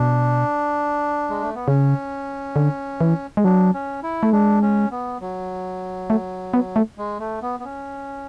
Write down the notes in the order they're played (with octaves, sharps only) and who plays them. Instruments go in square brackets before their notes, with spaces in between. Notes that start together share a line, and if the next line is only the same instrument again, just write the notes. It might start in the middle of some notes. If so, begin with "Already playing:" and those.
Already playing: [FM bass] B2 [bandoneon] D4
[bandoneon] G#3
A3
B3
[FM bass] C#3 [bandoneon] C#4
[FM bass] D3
E3
G#3
[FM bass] F#3 [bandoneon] D4
[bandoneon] C#4
E4
[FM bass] A3
[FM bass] G#3 [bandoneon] D4
[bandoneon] C#4
B3
F#3
[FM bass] A3
B3
A3
[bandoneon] G#3
A3
B3
B3
C#4